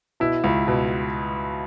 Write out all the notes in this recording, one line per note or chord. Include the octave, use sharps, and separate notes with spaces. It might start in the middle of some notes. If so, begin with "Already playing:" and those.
B2 E4
C#2
B2